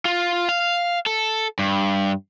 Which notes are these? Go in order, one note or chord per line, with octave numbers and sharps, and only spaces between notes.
F4
F5
A4
G2